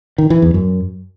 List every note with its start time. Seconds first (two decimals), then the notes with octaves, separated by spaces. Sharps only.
0.18 D#3
0.30 E3
0.42 E2
0.54 F#2